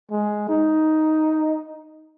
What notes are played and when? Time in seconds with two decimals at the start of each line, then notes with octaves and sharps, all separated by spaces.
0.11 G#3
0.49 D#4